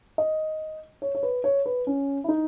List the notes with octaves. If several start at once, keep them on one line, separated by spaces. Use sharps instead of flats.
D#5
C#5
C#5
B4
C#5
B4
C#4
E4
D#4